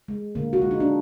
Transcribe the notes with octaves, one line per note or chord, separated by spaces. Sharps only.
G#3
D3 A#3
F#4
G#3 F4
D#4
D4